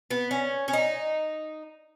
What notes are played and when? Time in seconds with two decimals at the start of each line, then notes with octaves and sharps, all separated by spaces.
0.11 B3
0.31 C#4
0.68 C#4
0.73 D#4